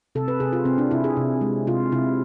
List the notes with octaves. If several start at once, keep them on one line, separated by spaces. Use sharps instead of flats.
C3 A4
B4
C3 G#4
F4
C3 C4
D4
C3 E4
G#4
C3
G#3
C3 F4
C3 E4